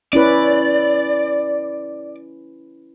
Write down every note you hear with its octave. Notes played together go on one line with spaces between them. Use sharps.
C#4 E4 B4 D5